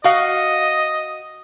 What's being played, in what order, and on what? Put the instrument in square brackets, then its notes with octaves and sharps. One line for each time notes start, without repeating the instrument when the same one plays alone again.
[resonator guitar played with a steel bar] F#4 F5 [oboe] D#5